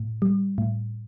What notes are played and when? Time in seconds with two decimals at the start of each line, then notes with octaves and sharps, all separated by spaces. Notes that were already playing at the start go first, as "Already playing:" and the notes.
Already playing: A2
0.22 G3
0.58 A2